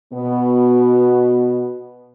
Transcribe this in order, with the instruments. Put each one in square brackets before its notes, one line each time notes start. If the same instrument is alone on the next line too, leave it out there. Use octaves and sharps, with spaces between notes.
[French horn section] B2 B3